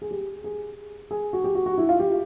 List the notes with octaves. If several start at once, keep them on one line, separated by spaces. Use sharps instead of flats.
G#4
G4
G#4
G#4
F#4
G4
F#4
F#4
E4
F4
G4